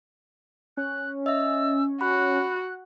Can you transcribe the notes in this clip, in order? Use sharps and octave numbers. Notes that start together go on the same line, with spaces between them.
C#4 F#6
D#5 E5 E6
F#4 B5 F#6